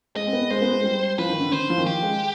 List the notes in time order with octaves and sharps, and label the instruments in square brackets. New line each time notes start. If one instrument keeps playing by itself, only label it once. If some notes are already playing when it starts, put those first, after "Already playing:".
[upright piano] G#3 [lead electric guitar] D#5
[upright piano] C4
B3
[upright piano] G#3 [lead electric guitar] C5
[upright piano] B3
G#3
G3
[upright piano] F3 [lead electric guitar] B4
[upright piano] D#3
D3
[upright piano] D3 [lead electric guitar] C5
[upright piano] F3
D#3
[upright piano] F3 [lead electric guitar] G4
[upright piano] G#3